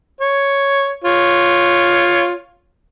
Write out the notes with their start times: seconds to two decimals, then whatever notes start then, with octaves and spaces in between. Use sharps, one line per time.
0.21 C#5
1.04 F4 C#5